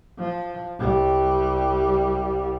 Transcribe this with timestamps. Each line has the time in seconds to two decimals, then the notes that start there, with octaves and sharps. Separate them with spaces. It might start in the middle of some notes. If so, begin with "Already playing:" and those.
0.18 F3
0.79 C2 G3